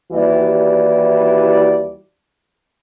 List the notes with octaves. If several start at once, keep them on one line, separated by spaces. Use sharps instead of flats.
D#2 E3 G3 E4 F#4 D5